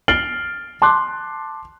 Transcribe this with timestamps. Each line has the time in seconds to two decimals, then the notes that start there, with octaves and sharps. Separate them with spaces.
0.08 F6 A6 C7 D7 F#7 G7
0.82 A5 C6 D6 F#6